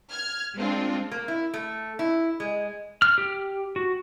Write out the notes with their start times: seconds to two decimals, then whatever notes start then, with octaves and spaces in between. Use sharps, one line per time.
0.10 F6 G#6
0.56 G#3 C4 D4 F4
1.12 A#3
1.28 E4
1.54 A3
1.99 E4
2.40 G#3
3.02 F6
3.18 G4
3.76 F#4